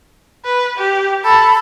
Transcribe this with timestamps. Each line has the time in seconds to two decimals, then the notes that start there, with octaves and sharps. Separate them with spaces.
0.45 B4
0.78 G4
1.24 A4 B5